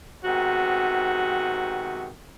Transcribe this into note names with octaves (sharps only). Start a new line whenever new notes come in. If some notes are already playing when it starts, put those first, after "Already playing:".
G#2 C3 D#3 B3 F#4